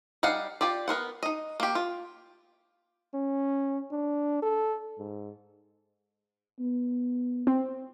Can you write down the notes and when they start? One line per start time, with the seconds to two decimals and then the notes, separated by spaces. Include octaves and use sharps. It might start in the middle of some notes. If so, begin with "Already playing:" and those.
0.23 G3 D#4 F5 F#5
0.61 F4 G4 D5
0.88 B3 A#4 C5 F#5
1.23 D#4 D#5
1.60 A#3 G4
1.75 F4
3.14 C#4
3.92 D4
4.42 A4
4.99 G#2
6.59 B3
7.47 C4